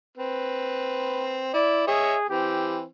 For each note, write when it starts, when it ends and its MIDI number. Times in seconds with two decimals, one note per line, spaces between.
0.17 1.51 60
0.17 1.51 71
1.54 1.84 64
1.54 1.86 74
1.87 2.25 68
1.87 2.15 73
1.87 2.15 75
1.87 2.15 76
2.29 2.85 52
2.29 2.85 60
2.29 2.79 67